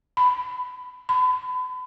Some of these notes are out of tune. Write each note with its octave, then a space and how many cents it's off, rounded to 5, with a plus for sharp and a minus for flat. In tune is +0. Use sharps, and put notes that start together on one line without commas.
B5 +15
B5 +35